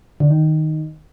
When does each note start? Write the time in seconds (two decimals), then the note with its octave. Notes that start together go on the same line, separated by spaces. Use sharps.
0.20 D3
0.30 D#3